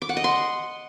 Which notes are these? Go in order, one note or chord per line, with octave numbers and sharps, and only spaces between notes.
D6
F#5
D#5
C6